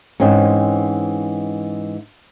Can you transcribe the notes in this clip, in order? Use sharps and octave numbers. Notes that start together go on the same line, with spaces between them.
G#2 E3 C4 C#4